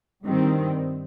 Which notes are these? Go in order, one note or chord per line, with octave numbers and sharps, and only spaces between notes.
G2 D#3 G3 C4